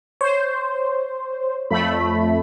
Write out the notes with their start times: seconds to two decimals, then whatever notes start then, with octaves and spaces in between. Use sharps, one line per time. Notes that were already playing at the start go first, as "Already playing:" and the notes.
0.21 C5 C#5
1.70 F2 A3 B5